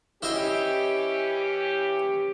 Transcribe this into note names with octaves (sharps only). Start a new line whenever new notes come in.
E3 C#4 E4 G4 C5 D#5